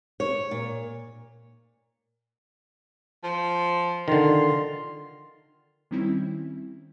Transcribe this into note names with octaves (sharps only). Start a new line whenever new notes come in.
C#5
A#2
F3
D3 D#3 F4
D#3 G3 C4 C#4 E4